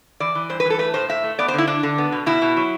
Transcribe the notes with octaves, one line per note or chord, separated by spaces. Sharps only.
E3 D5
E3
G2 C5
B4
E3
A4
A3 B4
A2 C5
A2 E5
A3
B3 D5
C5
D3 E4
D3 D4
D3
B3
B2
B2 E4
B2
F#3